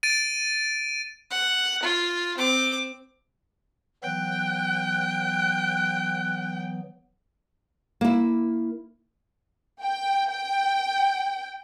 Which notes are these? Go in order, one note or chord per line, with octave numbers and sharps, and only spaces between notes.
A6 D7 D#7
F#5
F4
C4 D6
E3 F#3 B3 G5 F#6
A#3 E4
G5
G5